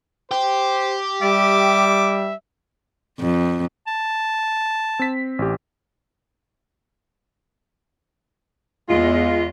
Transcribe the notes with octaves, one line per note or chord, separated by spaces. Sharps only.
G4 C5
G3 E5 D6
F2
A5
C4 B6
A1 G4
E2 G#3 F4